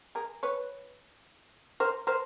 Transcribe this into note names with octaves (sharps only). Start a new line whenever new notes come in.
G#4 A#4
B4 C#5
A#4 C5
A#4 C5